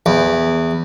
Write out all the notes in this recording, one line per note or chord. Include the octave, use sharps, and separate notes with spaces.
E2